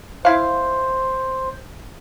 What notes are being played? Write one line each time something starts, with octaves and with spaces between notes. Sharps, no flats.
E4 C5 F5